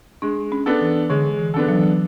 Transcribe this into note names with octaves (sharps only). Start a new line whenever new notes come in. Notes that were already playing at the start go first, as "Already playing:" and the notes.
G#3 D4
C#4
B3 D4 A4
E3
D3 G#3
E3
B3 D4 A4
F#3
E3
F#3